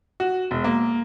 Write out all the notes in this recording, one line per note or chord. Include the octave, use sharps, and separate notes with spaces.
F#4
E1
A#3